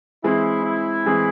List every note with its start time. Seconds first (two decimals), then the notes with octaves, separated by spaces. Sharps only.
0.24 E3 G#3 C4 E4 G#4
0.65 E4
1.06 E3 G#3 C4 G#4